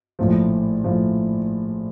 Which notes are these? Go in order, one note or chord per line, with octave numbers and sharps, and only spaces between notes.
A#1 A2 F3
A2 F3